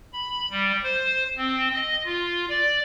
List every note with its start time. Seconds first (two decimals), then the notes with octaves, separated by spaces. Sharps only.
0.13 B5
0.50 G3
0.83 C5
1.37 C4
1.73 D#5
2.05 F4
2.49 D5